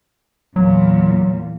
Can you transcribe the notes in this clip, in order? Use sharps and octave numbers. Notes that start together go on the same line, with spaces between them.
E2 A#2 F#3